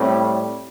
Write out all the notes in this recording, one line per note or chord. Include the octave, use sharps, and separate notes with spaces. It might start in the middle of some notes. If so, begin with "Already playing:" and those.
Already playing: A2 G3 C4